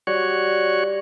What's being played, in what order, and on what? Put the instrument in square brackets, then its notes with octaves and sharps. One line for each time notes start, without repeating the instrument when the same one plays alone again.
[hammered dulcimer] G3 [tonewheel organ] F#4 C#5